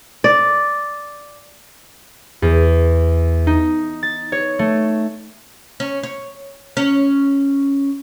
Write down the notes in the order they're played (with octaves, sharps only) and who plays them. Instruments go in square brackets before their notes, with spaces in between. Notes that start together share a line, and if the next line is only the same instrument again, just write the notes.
[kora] D5
[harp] E2
D#4
A6
C#5
A3
[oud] C#4
C#5
C#4